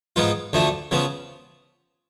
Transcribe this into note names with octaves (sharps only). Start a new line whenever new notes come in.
G#2 F3 B3 F4
D2 D3 F3 A3
C#3 F3 B3